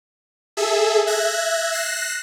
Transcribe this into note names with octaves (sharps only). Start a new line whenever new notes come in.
G#4 A4 E5
E5 F#6 G#6 A#6
F#6 A#6 C7 E7